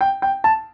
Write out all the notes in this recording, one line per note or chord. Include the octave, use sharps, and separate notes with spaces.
G5
G5
A5